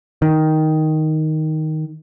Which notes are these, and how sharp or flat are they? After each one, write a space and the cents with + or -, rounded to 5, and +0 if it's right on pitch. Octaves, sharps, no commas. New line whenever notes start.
D#3 +5